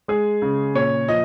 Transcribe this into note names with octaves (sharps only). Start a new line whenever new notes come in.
G#3 G#4
C#3
A#2 C#5
F3 D#5